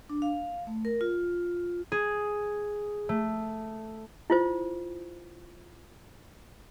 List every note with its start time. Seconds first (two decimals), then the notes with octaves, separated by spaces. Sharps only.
0.10 D4
0.22 F5
0.67 A3
0.85 A#4
1.01 F4
1.92 G#4
3.09 A3
4.30 E4 F4 C5